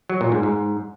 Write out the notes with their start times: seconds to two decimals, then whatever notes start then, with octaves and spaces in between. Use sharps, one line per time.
0.10 F#3
0.21 A#2
0.32 G#2
0.43 G#2